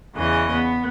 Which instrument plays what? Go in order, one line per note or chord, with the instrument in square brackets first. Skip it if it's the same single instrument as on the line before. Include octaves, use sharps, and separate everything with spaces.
[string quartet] E2 C#3 E3 D#5
B3